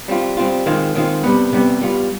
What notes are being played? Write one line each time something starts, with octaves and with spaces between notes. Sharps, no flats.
G3 C4 F4
G3 C4 F4
D#3 G#3 C4 F4
D#3 G#3 C4 F4
C3 G3 B3
C3 G3 B3
G3 B3 F4